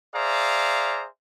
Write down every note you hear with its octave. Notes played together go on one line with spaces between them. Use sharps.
G#4 C5 D5 E5 F5 A#5